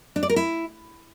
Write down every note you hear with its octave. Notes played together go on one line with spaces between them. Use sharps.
D4
D5
A#4
E4